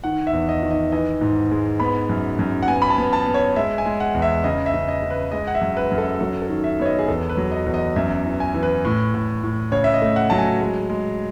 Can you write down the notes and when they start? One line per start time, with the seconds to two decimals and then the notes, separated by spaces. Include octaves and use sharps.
0.04 D#3 F#5
0.27 E5
0.33 E2
0.49 D#5
0.63 D#3
0.71 D#5
0.92 E3 D#5
1.21 G#2
1.51 G#3
1.80 B3 B5
2.09 F#2
2.39 F#2
2.63 F#5
2.68 B3 G#5
2.82 B5
2.90 A5
2.98 B3
3.13 A5
3.26 B3
3.34 C#5
3.56 G#3 E5
3.78 G#5
3.86 G#3
4.00 F#5
4.14 E2
4.22 E5
4.44 C#3 D#5
4.66 E5
4.74 C#3
4.88 D#5
5.02 C#3
5.10 B4
5.32 G#3 D#5
5.47 F#5
5.55 E5
5.61 F#2
5.77 B4
5.91 F#2
5.98 A4
6.20 F#3 A4
6.42 A4
6.50 D#3
6.64 E5
6.79 B3 C#5
6.86 D#5
6.99 G#4
7.08 E2 A4
7.30 B4
7.37 F#3
7.52 D#5
7.66 E2
7.74 D#5
7.96 F#2 E5
8.26 E3
8.40 G#5
8.54 E3
8.63 B4
8.85 A2
9.14 A2
9.43 A2
9.72 C#3 C#5
9.84 E5
9.94 D#5
10.02 A3
10.16 F#5
10.30 F#3 A5
10.38 G#5
10.61 G#3
10.90 G#3